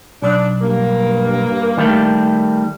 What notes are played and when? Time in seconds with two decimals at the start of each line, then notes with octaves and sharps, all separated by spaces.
0.22 B1 D4
0.61 G2 A#3
1.77 D#3 G3 A3